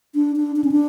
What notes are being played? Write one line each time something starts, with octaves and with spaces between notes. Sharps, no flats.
D4
D4
D4
C#4
D4